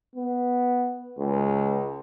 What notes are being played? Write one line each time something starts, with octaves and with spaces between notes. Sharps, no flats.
B3
C#2